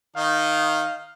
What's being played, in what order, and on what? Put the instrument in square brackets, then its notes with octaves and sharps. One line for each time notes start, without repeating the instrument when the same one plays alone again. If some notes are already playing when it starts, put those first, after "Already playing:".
[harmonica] D#3 D#4 [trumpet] F5